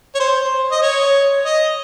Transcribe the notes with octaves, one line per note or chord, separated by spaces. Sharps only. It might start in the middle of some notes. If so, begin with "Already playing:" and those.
C#5
C5
D#5
C#5
D#5